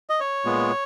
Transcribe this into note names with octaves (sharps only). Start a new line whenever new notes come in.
D#5
C#5
A#2 G#3 B3